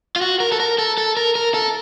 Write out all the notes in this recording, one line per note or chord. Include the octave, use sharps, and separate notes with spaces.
F4
F#4
A#4
A4
A#4
A4
A4
A#4
A#4
A4